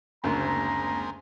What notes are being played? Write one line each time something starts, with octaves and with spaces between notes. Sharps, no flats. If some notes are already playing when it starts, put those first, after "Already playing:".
F#1 D2 G#3 A#3 C4 A#5